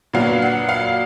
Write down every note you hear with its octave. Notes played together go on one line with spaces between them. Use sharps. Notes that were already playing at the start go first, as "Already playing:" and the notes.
A#2 F#3 B3 D4 F5
F#5
F5